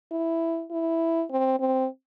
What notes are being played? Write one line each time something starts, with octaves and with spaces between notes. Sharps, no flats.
E4
E4
C4
C4